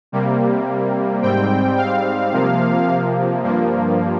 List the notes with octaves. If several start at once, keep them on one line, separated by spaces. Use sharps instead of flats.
C3 G3 A#3
G#2 G3 C4 G5
F5
C3 F3 A#3
G2 F3 A#3